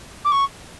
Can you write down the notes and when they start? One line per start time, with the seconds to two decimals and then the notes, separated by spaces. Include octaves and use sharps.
0.25 D6
0.32 C#6